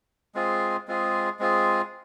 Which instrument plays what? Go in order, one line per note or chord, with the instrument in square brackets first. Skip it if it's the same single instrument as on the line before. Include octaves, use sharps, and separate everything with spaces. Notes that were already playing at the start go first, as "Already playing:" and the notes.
[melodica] G#3 C4 F4 G#4
G#3 C4 F4 G#4
G#3 C4 F4 G#4